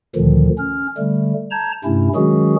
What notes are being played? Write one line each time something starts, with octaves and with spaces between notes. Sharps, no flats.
D2 A#2 D3 D#3 F3
C#4 F6
D3 G3 A3
A5 A#5 G6 G#6
G2 C3 A3 C#4 E4
D#3 F#3 G#3 C#4 F#4 G#4